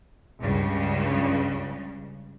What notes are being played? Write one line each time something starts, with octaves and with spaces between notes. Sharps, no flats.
C#2 G2 C#3